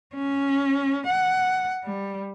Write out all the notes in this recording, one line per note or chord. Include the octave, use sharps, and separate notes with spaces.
C#4
F#5
G3